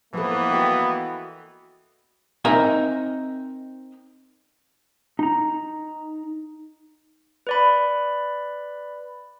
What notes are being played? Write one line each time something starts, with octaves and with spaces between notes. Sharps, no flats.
E3 F3 A#3 B3 E4 A4
F#4 D#5 G5
C4 D#4 A#4 D#5 E5 G#5
D#4 A#5
B4 D5 B5